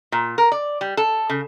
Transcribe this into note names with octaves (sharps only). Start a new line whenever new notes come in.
A#2
A#4
D5
G3
A4
C#3